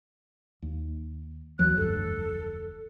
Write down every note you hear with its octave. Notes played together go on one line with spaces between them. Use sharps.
D#2
D#2 E3 F#3 F#6
F1 D2 G2 A4